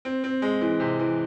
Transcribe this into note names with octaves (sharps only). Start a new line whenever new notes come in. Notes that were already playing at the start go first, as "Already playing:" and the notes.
C4
C4
G#3
E3
C3
E3